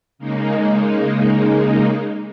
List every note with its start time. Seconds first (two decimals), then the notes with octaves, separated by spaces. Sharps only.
0.18 C#3 G#3 A#3 D#4